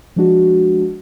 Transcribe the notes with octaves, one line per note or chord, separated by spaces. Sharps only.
F3 G#3 D4 F#4